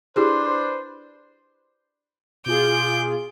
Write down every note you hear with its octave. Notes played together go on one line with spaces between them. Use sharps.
D4 E4 G4 G#4 B4 C5
B2 F4 G#4 D6 G6